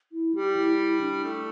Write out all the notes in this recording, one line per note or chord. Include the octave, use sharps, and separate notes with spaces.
E4
G3 G4
E4
E4
D4
A3